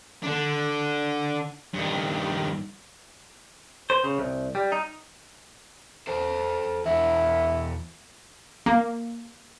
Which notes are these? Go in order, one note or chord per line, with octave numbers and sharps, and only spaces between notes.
D3 D4
G2 D#3
C5
C#3
C2
G3
D#4
A4 C5 A5
E2 E4 F#4
A#3